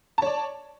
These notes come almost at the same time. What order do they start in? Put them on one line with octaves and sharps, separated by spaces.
A5 C#5 D5